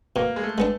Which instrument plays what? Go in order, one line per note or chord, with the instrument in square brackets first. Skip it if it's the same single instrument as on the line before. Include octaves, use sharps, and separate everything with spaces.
[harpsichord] B2 [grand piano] A#3
[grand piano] G#3
A3
[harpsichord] G#3 B3 D4